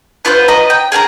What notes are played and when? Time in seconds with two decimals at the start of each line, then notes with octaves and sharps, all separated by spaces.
0.25 B3 F4 B4 C5
0.48 B4 D#5 A#5
0.70 G5
0.92 G#4 A#4 G#5 A#5